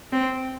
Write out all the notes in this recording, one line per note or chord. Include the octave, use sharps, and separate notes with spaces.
C4